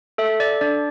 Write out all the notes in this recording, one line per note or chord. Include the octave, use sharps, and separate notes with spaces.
A4 E5
D5
D4 D5